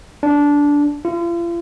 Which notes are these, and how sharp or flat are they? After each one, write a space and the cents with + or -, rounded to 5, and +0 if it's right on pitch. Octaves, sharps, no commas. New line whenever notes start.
D4 -15
F4 -40